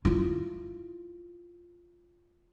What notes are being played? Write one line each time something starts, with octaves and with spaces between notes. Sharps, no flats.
E4 F4